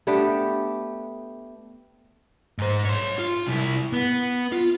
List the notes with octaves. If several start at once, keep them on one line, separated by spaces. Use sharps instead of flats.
A3 B3 D4 G4
G#2 C5
C#5 C6
F4
C2 E4
B3
F4